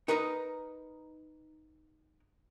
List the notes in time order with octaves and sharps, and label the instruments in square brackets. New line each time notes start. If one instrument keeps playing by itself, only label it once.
[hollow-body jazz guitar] D#4 A#4 B4 D#5 A#5